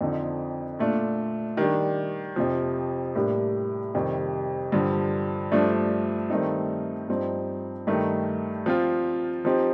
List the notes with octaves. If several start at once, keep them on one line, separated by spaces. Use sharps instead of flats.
F2 D3 F3 C4 D#4
A#2 A3 D4 F4
D#3 G3 D4
F2 C3 F3
A2 G3 A#3 D4 G4
F2 C3 D#3 G3
G2 D3 F3
G2 F3 A3 D4
G2 D#3 A3 C4 D#4
G2 F3 C4 D#4
G2 D#3 A3 D#4 G4
F3 C4 F4
F3 C4 D#4 G4